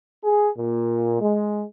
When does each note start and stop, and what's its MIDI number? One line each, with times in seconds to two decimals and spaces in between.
0.22 0.49 68
0.56 1.19 46
1.20 1.62 56